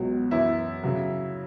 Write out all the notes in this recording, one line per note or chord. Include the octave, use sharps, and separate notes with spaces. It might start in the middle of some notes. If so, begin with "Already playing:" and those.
Already playing: C#2 B2 F#3
F#2 E3 E4
C#3 F#3